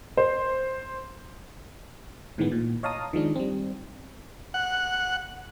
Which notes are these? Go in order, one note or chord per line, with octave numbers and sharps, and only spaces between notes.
C5
A2 D#3 E3 G#3 B3
A#2
C#5 D#5 F5 A5 A#5 D#6
D#3 F3 G#3 D4
G3 C4
F#5